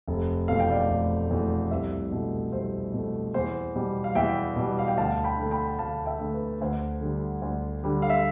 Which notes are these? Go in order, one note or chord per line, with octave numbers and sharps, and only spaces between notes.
F1
E2 B2 A3 F5
G5
D5 F5
F1
E2 B2 A3
C2 C5 E5
B2 A3
C2 C5
B2 A3
E2 C5
B2 G3
F5
E2 E5 G5
B2 G3
F5
G5
D2 F5 A5
G5 B5
D3 A3
G5 B5
D2 F5 A5
E5 G5
D3 A3
B4
D2 C5
D3 G3
D2
D3 G3
F5
E5